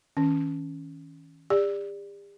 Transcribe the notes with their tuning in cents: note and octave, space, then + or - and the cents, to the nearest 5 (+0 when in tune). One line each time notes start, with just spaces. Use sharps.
D#3 +40 C#4 +0
G4 +45 D5 +0